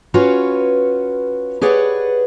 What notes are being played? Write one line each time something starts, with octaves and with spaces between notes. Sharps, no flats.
C#4 F4 F#4 B4 C#5
G4 G#4 B4 C#5 D5 F#5